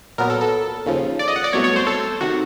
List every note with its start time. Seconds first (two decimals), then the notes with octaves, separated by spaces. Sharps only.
0.18 A#2 F#3 B3 A#4
0.30 A4
0.41 A4
0.86 D#2 C#3 F3
1.19 D5
1.28 D#5
1.36 F#5
1.44 D5
1.53 C2 B2 F#3 A3 C#5
1.64 C#5
1.76 C5
1.87 A4
2.21 C3 D#3 F#4